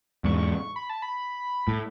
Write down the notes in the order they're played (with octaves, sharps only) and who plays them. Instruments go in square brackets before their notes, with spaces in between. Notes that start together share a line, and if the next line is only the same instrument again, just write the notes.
[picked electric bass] E2 G#2 [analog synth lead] C#6
[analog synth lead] B5
A5
B5
[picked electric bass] A2